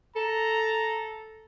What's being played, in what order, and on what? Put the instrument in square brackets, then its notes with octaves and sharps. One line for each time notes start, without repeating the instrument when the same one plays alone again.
[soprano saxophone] A4 [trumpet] A#5